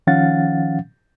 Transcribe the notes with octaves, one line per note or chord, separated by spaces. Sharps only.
D#3 F3 C#4 F5 F#5 A6